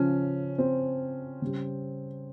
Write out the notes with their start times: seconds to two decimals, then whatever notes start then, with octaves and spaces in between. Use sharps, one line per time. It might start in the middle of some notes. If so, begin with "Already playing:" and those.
Already playing: C#3 F3 C#4
0.58 C4
1.42 C#3 G3